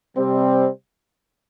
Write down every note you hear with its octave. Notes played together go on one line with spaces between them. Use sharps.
C3 G3 C4